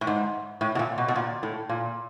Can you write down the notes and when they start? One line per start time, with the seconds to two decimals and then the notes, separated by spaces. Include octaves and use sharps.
0.01 A2
0.07 G#2
0.61 A2
0.75 B2
0.79 A#2
0.98 B2
1.08 B2
1.16 A#2
1.43 A2
1.69 A#2